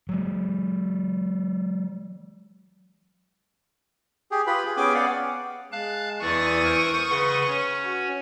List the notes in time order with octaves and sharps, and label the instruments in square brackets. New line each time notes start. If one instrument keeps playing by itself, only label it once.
[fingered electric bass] F#3 G#3
[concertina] G4 G#4
F4 G4 B4 B5
G#4
B3 C#4 G#4 G5 G#5 D6
B3 D5 F5 F#5
[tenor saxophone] G#3 [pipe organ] F5 A5 F#6
[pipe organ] E2 D5 [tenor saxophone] E3 [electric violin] C#6 D#6
[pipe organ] A#4 C5
[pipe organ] C#3 F#5 C6 [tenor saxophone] B4
[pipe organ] C#4 C#5
[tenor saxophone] F#4